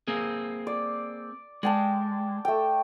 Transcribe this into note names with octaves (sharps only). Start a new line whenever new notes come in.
A#3 C4 G#4
D5
G#3 D5 G5 A5
A3 G5